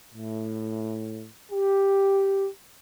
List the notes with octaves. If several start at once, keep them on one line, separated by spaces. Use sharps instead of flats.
A2
G4